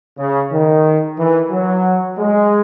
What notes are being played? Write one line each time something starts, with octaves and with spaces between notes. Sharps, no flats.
C#3
D#3
E3
F#3
G#3